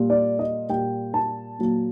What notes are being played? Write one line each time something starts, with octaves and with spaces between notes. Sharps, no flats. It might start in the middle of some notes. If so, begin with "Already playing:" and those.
Already playing: A#2 G3 A#3
D5
D#5
A#2 G3 A#3 G5
A5
A#2 F#3 A#3